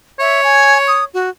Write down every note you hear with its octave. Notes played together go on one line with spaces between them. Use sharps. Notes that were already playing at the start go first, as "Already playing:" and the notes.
C#5 E5
G#5
D#6
F#4